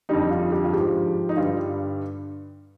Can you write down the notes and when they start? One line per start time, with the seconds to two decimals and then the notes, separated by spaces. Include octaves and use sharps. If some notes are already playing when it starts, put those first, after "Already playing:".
0.09 F2 D3 G3 D#4
0.31 F4
0.52 G4
0.65 F4
0.73 G#2 F3 G4
1.29 D#4
1.37 G2 D3 G3 F4